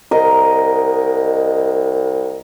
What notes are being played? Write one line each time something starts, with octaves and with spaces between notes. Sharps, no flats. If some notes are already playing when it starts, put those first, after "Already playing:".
C2 A#4 D#5